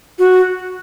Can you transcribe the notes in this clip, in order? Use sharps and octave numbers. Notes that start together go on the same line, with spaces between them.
F#4